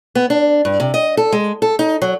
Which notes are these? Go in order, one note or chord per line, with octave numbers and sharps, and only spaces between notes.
B3
D4
G2
C3
D#5
A4
G#3
A4
D#4
F#3